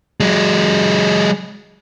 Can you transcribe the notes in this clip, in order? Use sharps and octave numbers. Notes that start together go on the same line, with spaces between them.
F#3 G#3